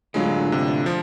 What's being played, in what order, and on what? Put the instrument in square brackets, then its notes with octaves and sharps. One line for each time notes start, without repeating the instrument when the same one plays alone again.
[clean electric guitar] A2 D3 F4 [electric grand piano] F#3 G#3
[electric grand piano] C3
F3